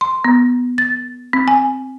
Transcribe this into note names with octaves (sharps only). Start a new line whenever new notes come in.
C6
B3
A6
C4
G#5